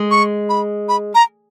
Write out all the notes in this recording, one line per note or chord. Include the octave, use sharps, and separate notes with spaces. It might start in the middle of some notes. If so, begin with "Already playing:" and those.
Already playing: G#3
C#6
B5
B5
A#5